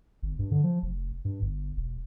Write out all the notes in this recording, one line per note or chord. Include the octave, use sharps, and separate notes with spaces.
G1
G2
D3
F3
F1
G2
G1
E1